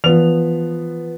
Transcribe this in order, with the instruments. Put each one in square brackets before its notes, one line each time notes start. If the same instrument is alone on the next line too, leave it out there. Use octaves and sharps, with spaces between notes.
[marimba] E3 [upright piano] F3 B3 F7